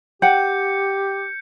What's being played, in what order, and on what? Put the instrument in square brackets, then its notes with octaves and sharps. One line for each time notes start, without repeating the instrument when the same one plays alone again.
[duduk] G4 [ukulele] F#5 G5 [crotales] G6 C#7